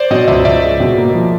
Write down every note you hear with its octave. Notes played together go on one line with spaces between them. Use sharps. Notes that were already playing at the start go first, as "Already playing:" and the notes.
Already playing: C5 D5
B2 C#5 D#5
C#2 D5 E5
C#2 D5 E5
G#3
B2
A#3
F3